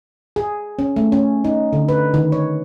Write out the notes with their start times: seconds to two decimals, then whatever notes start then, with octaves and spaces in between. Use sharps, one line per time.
0.36 G#4
0.79 C#4
0.96 A3
1.12 C#4
1.44 D#4
1.73 D3
1.89 B4
2.14 D#3
2.32 C#5